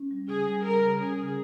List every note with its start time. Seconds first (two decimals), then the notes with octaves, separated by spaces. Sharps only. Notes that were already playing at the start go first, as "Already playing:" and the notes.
Already playing: C#4
0.11 G3
0.28 C#3 G#4
0.47 G3
0.64 G3 A#4
0.83 C#3
1.00 C#4 G#4
1.18 C#3